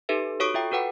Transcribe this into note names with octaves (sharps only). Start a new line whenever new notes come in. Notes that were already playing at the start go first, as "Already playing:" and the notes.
D#4 G4 A4 B4 E5
F#4 A4 C#5 C#6 D#6 D7
F4 E5 G5
F#4 A4 B4 F#5 G5